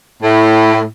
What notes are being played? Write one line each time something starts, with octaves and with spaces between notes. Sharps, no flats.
A2